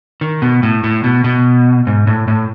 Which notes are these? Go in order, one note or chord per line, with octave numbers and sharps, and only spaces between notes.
D#3
B2
A2
A2
B2
B2
G#2
A2
A2